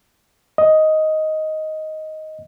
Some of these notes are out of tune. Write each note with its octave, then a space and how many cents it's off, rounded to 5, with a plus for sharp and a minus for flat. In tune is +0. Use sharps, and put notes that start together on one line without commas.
D#5 +5